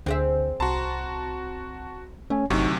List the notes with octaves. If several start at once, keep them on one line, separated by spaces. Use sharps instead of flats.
D2 D3 C4 G#4 E5
C2 F#4 A5 A#5 C6
A3 C#4 C#5 G#5
G1 D2 C3 F#3 D#4 C#6